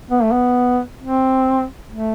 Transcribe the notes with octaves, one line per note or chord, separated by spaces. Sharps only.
B3
A3
B3
C4
A3